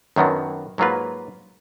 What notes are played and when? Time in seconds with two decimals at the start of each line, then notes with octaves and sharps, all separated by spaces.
0.16 F#2 D#3 F#3 B3 D4
0.78 G#2 F#3 A#3 F4 B4